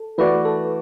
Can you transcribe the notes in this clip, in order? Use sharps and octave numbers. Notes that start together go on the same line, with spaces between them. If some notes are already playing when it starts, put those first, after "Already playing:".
Already playing: A4
E3 A3 F#4 B4 D5
A4